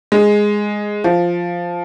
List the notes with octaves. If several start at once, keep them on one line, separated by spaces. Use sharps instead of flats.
G#3
F3